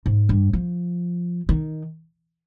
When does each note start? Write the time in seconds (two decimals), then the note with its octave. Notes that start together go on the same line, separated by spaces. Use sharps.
0.06 G#2
0.29 G2
0.53 F3
1.49 D#3